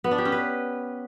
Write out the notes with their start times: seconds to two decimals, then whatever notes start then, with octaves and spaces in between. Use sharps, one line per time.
0.04 B3
0.11 D4
0.18 G4
0.25 C#4
0.32 B4